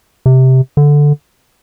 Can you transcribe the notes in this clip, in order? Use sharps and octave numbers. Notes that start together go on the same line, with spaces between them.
C3
D3